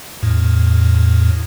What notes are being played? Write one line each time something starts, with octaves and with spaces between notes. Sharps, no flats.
E2 A2